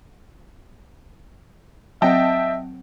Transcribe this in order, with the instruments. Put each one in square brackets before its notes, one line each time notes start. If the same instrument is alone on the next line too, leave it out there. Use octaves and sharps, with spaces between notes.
[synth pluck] F#3 C4 F#5 [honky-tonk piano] D#5 G5 A5 [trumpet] E5